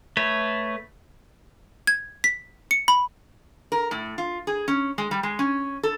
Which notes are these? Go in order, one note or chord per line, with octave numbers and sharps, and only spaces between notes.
A3 B4 C#5
G#6
B6
C#7
B5
A#4
A2
F4
G#4
C#4
G#3
G3
G#3
C#4
A4